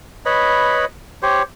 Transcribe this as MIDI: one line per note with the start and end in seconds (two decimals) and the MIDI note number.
0.26 0.85 71
0.26 0.85 73
0.26 0.85 75
0.26 0.85 83
1.23 1.43 67
1.23 1.43 72
1.23 1.43 73